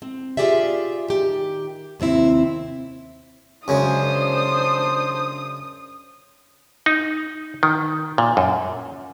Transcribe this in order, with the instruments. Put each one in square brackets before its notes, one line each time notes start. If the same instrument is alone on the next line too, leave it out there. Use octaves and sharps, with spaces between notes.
[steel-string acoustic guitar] C4
F4 G4 G#4 D5 E5
D#3 G4
D#2 C3 C4 E4
[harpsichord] F#2 C#3 G#3 [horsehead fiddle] D4 C5 [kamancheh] D#6
[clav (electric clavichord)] D#4
D#3
A#2
F#2